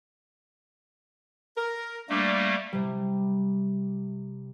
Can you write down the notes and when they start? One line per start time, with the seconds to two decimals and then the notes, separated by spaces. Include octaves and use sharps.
1.57 A#4
2.09 G3 A3 A#3 D4
2.73 C3 G3